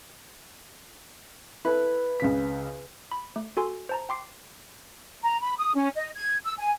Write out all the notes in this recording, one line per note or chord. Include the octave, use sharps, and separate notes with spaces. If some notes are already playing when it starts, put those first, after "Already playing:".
E4 A4 B4
C#2 C#3 B6
B5
A3
F#4 A4 G#5 C6
C5 A5 A#5
G5 C6 D6 C7
A#5
B5
D#6
C#4
D#5
G#6
E6
G#5